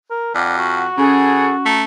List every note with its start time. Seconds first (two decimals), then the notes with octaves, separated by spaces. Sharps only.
0.11 A#4
0.35 F2 D5 F#5
0.58 F#4
0.98 C#3 C#4 G#4 A4 F#5
1.66 A3 A#5